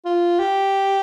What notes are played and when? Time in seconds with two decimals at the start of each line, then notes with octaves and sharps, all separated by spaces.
0.05 F4
0.39 G4